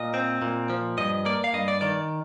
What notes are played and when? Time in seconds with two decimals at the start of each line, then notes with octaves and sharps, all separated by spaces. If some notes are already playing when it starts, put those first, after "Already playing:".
Already playing: A#2 D#5
0.14 C4
0.42 A#2
0.70 F3
0.98 G2 D#5
1.25 A#3 D5
1.44 F5
1.53 G2 D#5
1.68 D5
1.81 D#3 D5